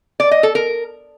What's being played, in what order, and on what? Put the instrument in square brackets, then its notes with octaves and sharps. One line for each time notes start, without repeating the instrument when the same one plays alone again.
[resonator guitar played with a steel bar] D5
D#5
A4
A#4